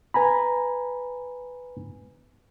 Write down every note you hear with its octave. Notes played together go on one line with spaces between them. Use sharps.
B4 G#5 A#5 B5